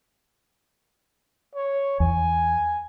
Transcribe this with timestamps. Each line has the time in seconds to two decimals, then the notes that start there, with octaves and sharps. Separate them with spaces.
1.55 C#5
2.00 E2 G#5